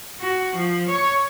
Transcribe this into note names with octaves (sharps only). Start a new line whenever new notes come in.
F#4
F3
C#5